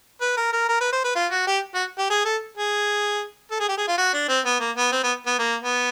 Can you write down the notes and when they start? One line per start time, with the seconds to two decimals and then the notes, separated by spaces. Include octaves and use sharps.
0.22 B4
0.37 A#4
0.53 A#4
0.69 A#4
0.81 B4
0.92 C5
1.04 B4
1.16 F4
1.31 F#4
1.47 G4
1.75 F#4
1.98 G4
2.10 G#4
2.25 A4
2.57 G#4
3.51 A4
3.60 G#4
3.69 G4
3.78 G#4
3.88 F4
3.98 F#4
4.14 D4
4.29 C4
4.45 B3
4.60 A#3
4.77 B3
4.92 C4
5.04 B3
5.27 B3
5.39 A#3
5.62 B3